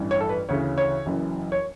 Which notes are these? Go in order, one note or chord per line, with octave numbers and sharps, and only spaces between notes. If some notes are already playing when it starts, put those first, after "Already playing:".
Already playing: A1 G2 E3
C#5
A4
B4
D2 C#3 E3 C#5
C#5
F#1 F#2 E3
C#5